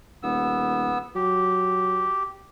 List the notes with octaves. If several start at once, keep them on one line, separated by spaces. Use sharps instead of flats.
D#1 B3 E6
F#3 G4